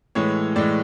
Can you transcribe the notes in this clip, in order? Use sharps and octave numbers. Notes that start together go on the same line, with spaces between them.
A2 E3 G#3 C#5
A2 E3 G#3 D5